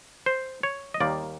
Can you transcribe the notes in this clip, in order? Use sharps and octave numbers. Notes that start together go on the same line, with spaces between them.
C5
C#5
D#5
D#2 D#3 G3 A#3 D5